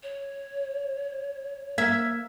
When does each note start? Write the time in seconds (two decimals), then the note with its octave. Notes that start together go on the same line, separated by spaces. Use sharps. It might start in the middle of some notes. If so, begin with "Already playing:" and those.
0.03 C#5
1.78 A#3 E5 G#6